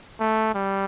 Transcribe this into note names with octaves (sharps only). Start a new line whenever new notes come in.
A3
G3